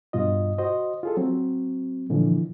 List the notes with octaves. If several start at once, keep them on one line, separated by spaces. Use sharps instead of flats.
G2 B2 F4 D#5
F#4 C5 D#5
F4 G#4 A4
F#3 C4
A#2 D3 E3 F3